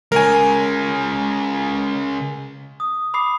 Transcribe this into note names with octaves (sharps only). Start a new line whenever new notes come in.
C#3 G#3 A#4 G#5
D#6
B5 D6 D#6 C7